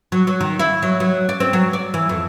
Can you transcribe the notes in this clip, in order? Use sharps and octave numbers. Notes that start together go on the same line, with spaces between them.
F#3
F#3
D#3
E4
F#3
F#3
D5
C4
F#3
D5
E3
F2